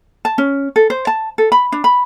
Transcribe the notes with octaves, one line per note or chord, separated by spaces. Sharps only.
A5
C#4
A4
C5
A5
A4
B5
D4
B5